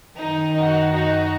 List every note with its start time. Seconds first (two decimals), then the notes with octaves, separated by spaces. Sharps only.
0.19 F#2 D#3 D#4
0.57 D#4 F#4
0.94 D#4 F#4